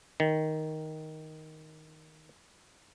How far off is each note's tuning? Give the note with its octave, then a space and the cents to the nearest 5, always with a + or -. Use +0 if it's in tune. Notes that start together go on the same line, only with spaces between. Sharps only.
D#3 +5